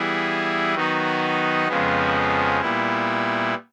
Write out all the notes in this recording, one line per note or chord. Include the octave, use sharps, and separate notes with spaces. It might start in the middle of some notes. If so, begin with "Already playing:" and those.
Already playing: E3 G3 B3 E4 G#4
D#3 F#3 B3 D#4 F#4
F2 C#3 F3 G#3 B3
A#2 G3 B3 E4